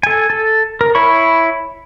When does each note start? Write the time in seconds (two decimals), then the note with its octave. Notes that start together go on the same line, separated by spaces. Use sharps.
0.03 A4 G#5
0.30 A4
0.81 A#4
0.95 E4 C#5 B5 C#6